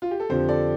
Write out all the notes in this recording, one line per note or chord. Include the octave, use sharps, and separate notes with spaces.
F4
G4
A4
F2 D3 F3 G4 C5
A4 D5